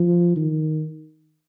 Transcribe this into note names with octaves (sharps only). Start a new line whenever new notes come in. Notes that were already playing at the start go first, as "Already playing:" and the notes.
Already playing: F3
D#3